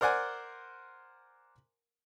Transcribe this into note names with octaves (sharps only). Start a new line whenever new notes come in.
A#4 C5 D5 F#5 G#5